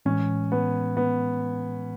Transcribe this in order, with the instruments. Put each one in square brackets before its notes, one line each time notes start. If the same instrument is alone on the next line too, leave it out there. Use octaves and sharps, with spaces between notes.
[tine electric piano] A2 E3 G#3 [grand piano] C#4
[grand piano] B3
B3